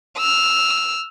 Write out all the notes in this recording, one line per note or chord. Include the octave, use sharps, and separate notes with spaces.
E6 F6